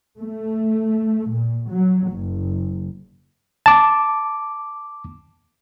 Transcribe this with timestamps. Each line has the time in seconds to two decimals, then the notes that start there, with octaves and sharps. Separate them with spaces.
0.19 A3
1.30 A#2
1.70 F#3
2.11 F#1
3.66 A5 D6